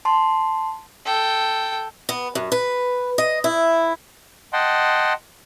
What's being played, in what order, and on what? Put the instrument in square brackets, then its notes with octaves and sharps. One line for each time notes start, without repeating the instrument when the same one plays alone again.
[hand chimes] A5 C6
[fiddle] A4 G5
[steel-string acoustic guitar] B3
F#2
B4
D#5
E4
[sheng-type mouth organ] D#5 F#5 G5 A5 C6